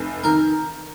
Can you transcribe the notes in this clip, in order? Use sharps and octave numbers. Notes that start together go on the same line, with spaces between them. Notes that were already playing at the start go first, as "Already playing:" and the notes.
Already playing: F1
D#3 A#4